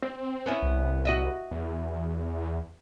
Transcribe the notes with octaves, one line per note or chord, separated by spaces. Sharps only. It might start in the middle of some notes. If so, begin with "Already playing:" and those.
C4
B3 C#4 E4
C2
F#4 D#5 E5
E2